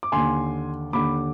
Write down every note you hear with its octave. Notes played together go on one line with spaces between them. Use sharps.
D6
D#2 D3 G#5 C6
D#2 D3 B5 D6